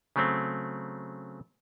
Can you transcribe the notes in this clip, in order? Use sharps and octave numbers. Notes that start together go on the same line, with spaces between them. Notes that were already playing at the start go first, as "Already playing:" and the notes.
C#3 F#3 A3 C4